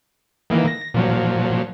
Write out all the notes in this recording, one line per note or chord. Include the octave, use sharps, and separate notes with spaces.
D#3 E3 A#3
A#6
A#2 F3 F#3